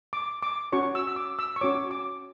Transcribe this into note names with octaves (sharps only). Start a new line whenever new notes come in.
D6
D6
C#4 F#4 C#5 C#6
E6
E6
D6
E6
C#6
C#4 F#4 C#5 D6
D6